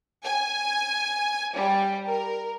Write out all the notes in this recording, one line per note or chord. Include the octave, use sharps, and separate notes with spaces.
G#5
G3
A#4